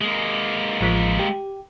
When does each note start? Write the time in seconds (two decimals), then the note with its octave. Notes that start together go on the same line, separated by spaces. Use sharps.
0.01 G#3 A#3
0.81 A1 F3 B6
1.19 G4